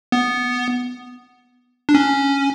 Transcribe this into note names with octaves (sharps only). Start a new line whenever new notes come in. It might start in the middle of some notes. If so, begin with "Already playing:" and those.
B3
D4
C#4